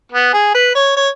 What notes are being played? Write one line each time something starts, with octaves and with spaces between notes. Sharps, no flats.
B3
G#4
B4
C#5
C#5